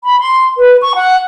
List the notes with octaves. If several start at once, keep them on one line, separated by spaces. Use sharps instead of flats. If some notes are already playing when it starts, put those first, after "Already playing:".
B5
C6
B4
C#6
F#5